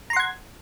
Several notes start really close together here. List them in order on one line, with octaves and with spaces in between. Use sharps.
A#5 C6 F#5 G#6